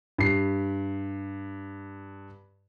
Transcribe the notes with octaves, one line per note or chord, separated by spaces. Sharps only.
G2 C7